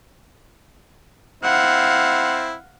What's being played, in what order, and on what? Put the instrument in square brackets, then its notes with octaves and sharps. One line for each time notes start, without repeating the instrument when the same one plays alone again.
[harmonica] C4 E4 [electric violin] F5 F#5